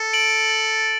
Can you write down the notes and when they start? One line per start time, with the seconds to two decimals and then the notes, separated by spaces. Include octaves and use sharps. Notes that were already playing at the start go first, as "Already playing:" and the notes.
Already playing: A4
0.13 D7 F#7
0.49 A6